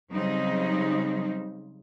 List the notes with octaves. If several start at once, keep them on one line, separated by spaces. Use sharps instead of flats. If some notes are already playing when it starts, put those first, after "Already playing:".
C#3 F#3 G3 C4 D#4